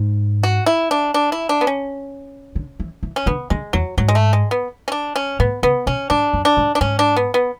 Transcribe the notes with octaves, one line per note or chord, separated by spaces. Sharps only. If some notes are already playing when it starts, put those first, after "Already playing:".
Already playing: G#2
F#4
E4
D4
D4
E4
D4
B3
C#4
D3
E3
E3
C#4
D3 B3
D3 G#3
E2 F#3
G#2 F#3
G#3
A3
G#3
B3
C#4
D4
C#4
A2 B3
C#3 B3
B2 C#4
G#2 D4
F#2
D4
G#2
D4
G#2 C#4
D4
B3
B3